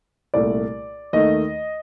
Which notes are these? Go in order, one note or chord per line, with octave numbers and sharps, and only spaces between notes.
C2 A#2 A3 D5
D#2 D#3 A3 D#5